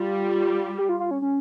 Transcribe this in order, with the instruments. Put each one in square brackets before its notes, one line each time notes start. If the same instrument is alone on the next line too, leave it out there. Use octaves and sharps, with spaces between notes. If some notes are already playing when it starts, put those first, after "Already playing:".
Already playing: [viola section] G3 [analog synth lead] F4
[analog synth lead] G4
F4
F4
C#4
C#4